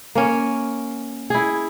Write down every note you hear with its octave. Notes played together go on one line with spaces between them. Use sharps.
A#3 C#4
E4 G#4